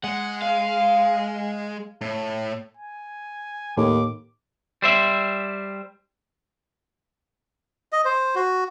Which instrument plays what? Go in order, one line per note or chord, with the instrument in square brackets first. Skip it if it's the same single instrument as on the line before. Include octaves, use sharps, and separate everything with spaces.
[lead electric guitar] G#3 [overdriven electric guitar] F#5
[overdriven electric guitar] F5
[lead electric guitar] A2
[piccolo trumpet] G#5
[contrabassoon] D#2 [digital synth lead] A2 [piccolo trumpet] D6
[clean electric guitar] G3 C5 E5
[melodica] D#5
C5
F#4